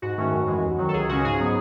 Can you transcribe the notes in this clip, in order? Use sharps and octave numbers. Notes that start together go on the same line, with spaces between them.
G#2 F#4
D#3 A3 C#4
F#2
E3 G#3
D#2
D#3 F#3
A4
C#2 G#4
C#3 G#3 C#4 F#4
G#2 G#4
F#3 B3